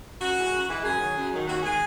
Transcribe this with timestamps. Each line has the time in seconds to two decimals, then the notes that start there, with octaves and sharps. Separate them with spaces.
0.20 F#2 F#4
0.36 E3 G#3
0.52 F#2
0.67 E3 G#3
0.83 F#2 G#4
0.99 D#3 F#3
1.16 F#2
1.31 D#3 F#3
1.47 D#2 F#4
1.63 D#3 G#3 G#4